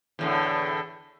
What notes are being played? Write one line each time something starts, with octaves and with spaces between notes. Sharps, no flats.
E2 A2 D3